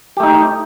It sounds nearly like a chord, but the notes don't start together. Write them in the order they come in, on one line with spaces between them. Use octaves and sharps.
G4 A3 D#4